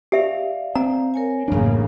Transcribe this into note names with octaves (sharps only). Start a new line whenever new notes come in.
G4 D5 E5 F5
C4 A#5
A#4 C#5 G#5
A1 F#2 C#3 A#3 D4